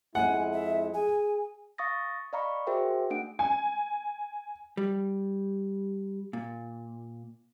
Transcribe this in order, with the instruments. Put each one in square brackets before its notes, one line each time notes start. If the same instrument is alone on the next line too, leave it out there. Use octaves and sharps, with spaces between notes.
[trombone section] F2 G#3 E4 [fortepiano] F#5 [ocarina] G#5
[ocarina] E5
[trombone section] G#4 [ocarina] G#5
[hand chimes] F5 C#6 D#6 A6 A#6
D5 D#5 F5 A#5 B5 C#6
F#4 G#4 A#4 C5 E5 G5
A3 D4 F#5 D7
[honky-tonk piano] G#5
[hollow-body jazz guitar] G3
A#2